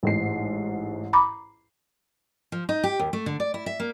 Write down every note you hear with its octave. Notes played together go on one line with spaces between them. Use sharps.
A1 G#2 C7
A#5 B5 D6
F3
D#4
G4
D#2
A3
D3
D5
E4
E5
A#3